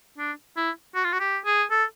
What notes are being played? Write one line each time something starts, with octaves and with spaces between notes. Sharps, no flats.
D4
E4
F#4
F4
F#4
G4
G#4
A4